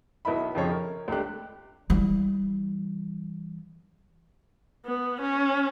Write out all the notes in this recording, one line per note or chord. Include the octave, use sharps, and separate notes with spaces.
B1 B3 E4 D#5 E5 B5
F2 C#3 F3 D#4 C#5
A#4
C#2 A3 D4 G4 F#6
E3 G3
B3
C#4